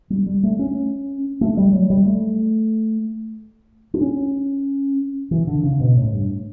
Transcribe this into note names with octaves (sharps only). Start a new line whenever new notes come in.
G3
G3
A3
C#4
A3
G3
F#3
G3
A3
D4
C#4
E3
D3
C#3
B2
A2
G2